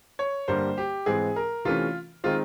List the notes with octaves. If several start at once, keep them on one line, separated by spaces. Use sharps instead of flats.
C#5
G2 D3 G3 A#3 C5
G4
G#2 E3 G#3 C4 G#4
A#4
C3 E3 A3 C#4 F4
D#3 G#3 C4 F4